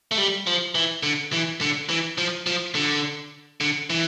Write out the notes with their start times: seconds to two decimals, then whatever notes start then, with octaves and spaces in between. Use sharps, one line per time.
0.11 A3
0.18 G3
0.47 F3
0.75 E3
1.03 D3
1.33 E3
1.61 D3
1.89 E3
2.18 F3
2.47 F3
2.75 D3
3.61 D3
3.90 E3